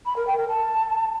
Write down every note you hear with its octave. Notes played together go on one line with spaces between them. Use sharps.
B5
A#4
G5
A#4
A5